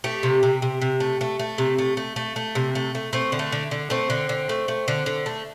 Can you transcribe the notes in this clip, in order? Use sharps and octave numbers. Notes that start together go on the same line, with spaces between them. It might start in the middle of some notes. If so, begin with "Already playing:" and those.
A3 G4
C3
C3
C3
C3
A3
A3
A3
C3
A3
A3
A3
A3
C3
A3
A3
A3 C4
D3
A3
D3
D3
A3 C4
D3
D3
A3
A3
D3
D3
A3